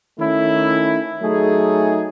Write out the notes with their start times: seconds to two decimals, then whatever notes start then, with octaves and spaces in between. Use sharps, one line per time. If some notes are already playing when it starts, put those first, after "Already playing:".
0.17 D#3 A3 C#4 E4
1.22 F#3 A3 D#4 G#4